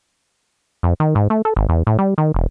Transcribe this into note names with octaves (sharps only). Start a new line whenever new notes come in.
F2
D#3
G#2
A3
A4
G#1
E2
A2
G3
D#3
E1